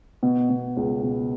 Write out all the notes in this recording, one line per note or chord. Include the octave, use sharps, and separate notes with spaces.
B2
B2
C#2
B2